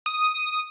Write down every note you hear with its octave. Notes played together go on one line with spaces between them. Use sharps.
D#6